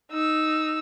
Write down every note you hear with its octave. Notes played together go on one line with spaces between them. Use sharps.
D#4 E6